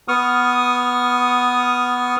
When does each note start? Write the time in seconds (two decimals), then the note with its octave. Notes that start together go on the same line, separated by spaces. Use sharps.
0.08 B3 C#6 D#6 F6